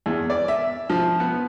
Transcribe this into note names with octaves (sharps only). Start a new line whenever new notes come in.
E2
D5
E5
F3
B3